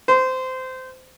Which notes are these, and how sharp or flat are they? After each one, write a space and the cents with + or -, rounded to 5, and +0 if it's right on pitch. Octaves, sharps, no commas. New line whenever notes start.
C5 -20